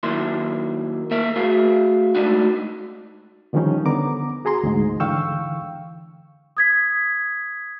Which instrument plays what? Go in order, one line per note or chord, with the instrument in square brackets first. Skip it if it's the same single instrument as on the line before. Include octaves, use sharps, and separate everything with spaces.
[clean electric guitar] D#3 F#3 A#3 E4 C6
A#3 A#4 E5
A3 F#4 G#4 E5 F5
G#3 A3 D4 D#4 F#4
[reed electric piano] D3 D#3 F3 G3 C#4 D#4
D3 B3 A#5 D6
F#4 G#4 A#5 C6
D2 G#2
D3 E3 F5 G5 C#6 E6
[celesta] D#6 G#6 B6